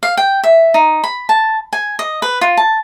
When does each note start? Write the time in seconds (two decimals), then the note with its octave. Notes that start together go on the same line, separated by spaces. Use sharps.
0.03 F5
0.17 G5
0.44 E5
0.74 D#4
1.04 B5
1.29 A5
1.73 G#5
1.99 D#5
2.22 B4
2.41 F4
2.57 A5